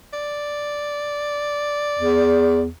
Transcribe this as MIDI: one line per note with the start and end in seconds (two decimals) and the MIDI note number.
0.13 2.62 74
1.99 2.69 40